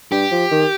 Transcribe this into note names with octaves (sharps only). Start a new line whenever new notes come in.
G2 G4
F3
D#3